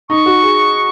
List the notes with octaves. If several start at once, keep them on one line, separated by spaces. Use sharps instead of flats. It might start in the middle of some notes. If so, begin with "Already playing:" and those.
D#4 C#6
F#4
G#4